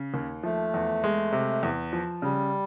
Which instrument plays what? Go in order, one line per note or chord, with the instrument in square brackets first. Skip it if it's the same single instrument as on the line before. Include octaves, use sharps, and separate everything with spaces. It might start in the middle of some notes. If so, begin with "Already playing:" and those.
Already playing: [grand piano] C#3
D#2
[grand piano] F3 [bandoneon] A3
[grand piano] E2
G#3
C3
E2
F3
[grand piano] C#3 [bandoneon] G3